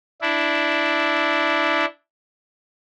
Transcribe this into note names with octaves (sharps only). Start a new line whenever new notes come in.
D4 E4